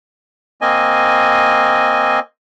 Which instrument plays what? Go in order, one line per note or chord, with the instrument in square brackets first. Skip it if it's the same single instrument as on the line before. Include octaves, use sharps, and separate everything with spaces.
[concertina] A#3 C4 D#5 G#5